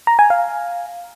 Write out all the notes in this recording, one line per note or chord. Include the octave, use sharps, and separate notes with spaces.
A#5
G#5
F5